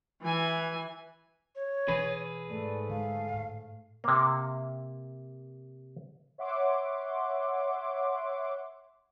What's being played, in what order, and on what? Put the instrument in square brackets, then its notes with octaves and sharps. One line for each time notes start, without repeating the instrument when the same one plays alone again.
[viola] E3 G#5
[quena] C#5
[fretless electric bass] B2 E3 D4 [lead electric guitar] G#4 B4
[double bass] G#2 A3 [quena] D5
[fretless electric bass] D3 G#3 [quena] F5
[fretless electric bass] A2
[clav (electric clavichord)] C3 A#3
[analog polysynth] C#5 E5 F#5 C6 D6